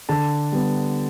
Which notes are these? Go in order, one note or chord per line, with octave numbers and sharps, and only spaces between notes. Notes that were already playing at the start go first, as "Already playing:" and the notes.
D3 A5
G3 B3